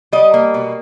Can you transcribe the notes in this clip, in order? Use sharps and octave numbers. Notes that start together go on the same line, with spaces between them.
G3 D#5
A#3
B2